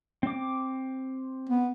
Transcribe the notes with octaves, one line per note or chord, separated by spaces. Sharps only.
C4 D6
B3